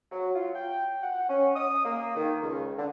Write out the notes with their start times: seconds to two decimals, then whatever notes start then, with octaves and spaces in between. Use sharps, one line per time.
0.12 F#3
0.36 F4
0.55 G5
1.03 F#5
1.30 C#4
1.56 D#6
1.85 A#3
2.16 D#3
2.42 C#2
2.79 D3